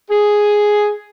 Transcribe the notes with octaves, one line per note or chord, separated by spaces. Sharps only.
G#4